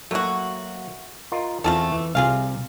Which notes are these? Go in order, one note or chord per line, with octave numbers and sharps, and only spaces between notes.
F#3 A3 A#3 F#4 F#5
F4 A#4 D#5
E2 A3 C4 F4 A4
E3
C2 C3 F4 G#4 F5